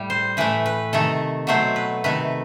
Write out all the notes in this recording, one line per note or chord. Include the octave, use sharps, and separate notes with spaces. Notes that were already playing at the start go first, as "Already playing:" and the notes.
Already playing: A2 G3
C5
A2 E3 A3 B4
B4
C3 D#3 A3 A4
B2 F#3 A3 C5
B4
C3 D#3 A3 B4